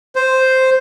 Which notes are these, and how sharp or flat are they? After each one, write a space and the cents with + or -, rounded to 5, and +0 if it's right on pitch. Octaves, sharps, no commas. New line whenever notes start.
C5 +0